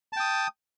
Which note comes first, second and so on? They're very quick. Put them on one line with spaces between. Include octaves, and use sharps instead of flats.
A5 G5 D#6